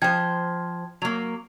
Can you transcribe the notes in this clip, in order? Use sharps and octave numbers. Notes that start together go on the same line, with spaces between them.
F3 C5 G5 G#6
F#3 A#3 F7